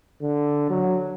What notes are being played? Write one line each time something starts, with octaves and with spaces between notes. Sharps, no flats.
D3
F#3